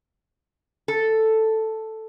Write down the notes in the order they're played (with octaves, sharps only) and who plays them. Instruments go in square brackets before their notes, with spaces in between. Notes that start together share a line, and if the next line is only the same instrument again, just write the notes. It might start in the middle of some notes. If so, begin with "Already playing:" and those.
[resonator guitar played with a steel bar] A4